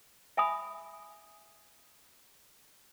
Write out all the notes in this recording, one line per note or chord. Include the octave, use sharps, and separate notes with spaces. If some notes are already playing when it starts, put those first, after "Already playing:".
E5 G#5 B5 D#6